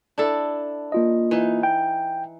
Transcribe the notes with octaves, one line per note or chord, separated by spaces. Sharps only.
D4 E4 A4
A#3 F4 D#5
E3 D#4
G5